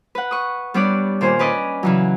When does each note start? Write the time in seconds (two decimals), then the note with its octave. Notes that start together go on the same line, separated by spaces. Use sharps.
0.15 B4 F#5
0.31 C#6 D#6
0.74 G3 B3 D4 G4 C#5 D5
1.21 A#2 D#3 C5 G#5
1.39 C#4 B4 D5 D#5
1.83 C#3 E3 F#3